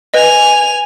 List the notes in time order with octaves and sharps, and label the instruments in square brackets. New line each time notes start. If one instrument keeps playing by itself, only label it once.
[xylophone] B4 D#5 [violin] G#5 F7